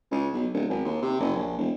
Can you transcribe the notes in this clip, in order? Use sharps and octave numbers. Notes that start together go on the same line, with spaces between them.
C#2
B1
D1
G#1
D#2
C3
F#1
A#1
E1